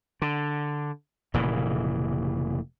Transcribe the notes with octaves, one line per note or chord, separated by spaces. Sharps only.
D3
F1 A#2 C#3 E3